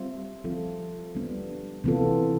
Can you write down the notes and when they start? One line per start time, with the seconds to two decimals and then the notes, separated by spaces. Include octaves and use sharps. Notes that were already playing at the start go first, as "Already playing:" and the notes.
Already playing: G3 C4 F4 C5 E5
0.44 F3 C4 F4 A4
1.15 G3 B3 D4
1.84 C3 E3 B3 F4 A4